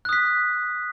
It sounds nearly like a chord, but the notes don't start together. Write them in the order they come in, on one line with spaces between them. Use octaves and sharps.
F#6 D#6 B6